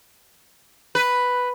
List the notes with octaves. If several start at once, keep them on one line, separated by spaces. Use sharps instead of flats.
B4